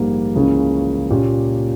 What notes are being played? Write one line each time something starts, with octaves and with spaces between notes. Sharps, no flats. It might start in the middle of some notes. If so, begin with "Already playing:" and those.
Already playing: A#1 G#2 G3 A#3
C#2 C#3 E3 A#3 C#4
A#2 A#3 C#4 G4